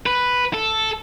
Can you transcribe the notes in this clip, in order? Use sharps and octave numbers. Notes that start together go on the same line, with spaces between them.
B4
A4